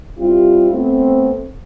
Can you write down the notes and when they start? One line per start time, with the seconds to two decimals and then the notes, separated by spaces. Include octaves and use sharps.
0.19 G3 C4 E4 F4 G4
0.70 A3 B3 C4